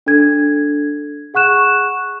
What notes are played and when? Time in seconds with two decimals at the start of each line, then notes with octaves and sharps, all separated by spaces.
0.06 D4 A4 G#6
1.34 G#4 F#5 C#6 F#6 E7